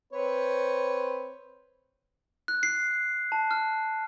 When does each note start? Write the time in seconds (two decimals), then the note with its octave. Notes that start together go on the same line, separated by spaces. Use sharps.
0.13 C4 B4 C#5
2.48 F#6
2.63 C7
3.32 A5
3.51 F6